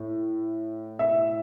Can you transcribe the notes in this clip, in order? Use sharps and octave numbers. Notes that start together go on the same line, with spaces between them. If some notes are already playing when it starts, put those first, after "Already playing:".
Already playing: A2
E5